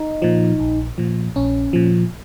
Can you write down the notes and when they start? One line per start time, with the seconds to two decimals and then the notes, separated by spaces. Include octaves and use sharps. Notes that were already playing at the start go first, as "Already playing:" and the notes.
Already playing: D#4
0.22 A#2 F3
0.60 A#1
0.98 A#2 F3
1.36 A#1 C#4
1.73 A#2 F3